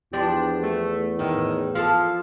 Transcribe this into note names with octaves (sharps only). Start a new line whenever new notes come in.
E2 F3 B3 D4 G4
A3
A2 D#3
F3 G#4 A4 F5